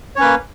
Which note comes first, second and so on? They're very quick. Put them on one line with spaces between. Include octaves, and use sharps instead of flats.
C#5 C#4 B4 A#3